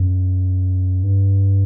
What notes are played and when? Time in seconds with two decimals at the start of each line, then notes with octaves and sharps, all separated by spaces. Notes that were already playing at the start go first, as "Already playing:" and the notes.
Already playing: F#2
1.03 G2